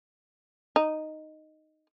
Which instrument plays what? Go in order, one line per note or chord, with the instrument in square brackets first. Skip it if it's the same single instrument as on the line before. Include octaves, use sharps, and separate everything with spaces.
[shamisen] D#4